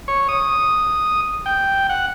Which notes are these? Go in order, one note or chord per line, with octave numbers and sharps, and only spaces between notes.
C#5
D#6
G5
F#5